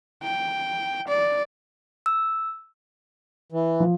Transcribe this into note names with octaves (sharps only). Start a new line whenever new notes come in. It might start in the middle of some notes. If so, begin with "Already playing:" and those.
G5
D5
E6
E3
F3